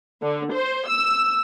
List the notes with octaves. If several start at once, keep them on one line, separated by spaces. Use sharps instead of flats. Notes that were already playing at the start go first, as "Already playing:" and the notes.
D3
C5
E6